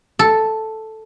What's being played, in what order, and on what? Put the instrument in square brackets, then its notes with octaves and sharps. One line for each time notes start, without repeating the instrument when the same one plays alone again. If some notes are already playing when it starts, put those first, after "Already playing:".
[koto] A4